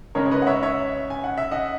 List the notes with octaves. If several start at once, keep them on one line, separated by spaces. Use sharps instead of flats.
C#3 G#3 C#4 A#4 C#5
C#5
B4 D#5
F#5
C#5 E5
C#5 E5
G#5
F#5
E5
D#5 F#5